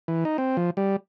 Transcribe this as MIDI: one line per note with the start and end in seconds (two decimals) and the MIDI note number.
0.08 0.24 52
0.25 0.37 63
0.38 0.57 60
0.57 0.70 53
0.77 0.96 55